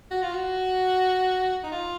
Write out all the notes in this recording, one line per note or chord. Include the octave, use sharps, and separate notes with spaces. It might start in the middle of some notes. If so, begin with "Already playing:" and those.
F#4
F4
F#4
D#4
F4